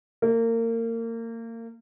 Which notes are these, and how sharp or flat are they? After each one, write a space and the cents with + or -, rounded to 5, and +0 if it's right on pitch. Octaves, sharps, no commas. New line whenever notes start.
A#3 -30